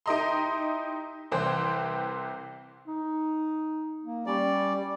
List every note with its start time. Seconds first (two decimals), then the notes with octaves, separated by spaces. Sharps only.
0.06 D#4 E4 G4 D#5 A#5 C6
1.32 C2 C3 E3 C5 G5 C6
2.87 D#4
4.04 A#3
4.26 G3 C#4 D5